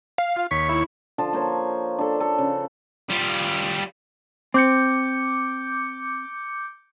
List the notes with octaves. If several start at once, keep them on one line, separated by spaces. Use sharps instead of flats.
F5
F4
D#2 C#5 C#6 B6
E4
D3 F3 A5
A#3 C5 C#5
D4 A4
A4
C#3
G3 F4
C4 D6 G6 C#7